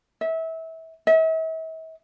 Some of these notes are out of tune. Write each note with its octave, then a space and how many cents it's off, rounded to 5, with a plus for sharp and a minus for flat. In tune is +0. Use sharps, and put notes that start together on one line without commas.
E5 -25
E5 -40